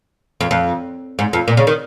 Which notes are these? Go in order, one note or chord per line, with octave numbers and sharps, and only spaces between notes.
F2
F2
G#2
F2
A#2
C#3
D#3